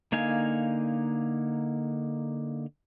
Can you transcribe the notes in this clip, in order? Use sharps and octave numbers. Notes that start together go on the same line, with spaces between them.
D3 A#3 D#4 F5 G#5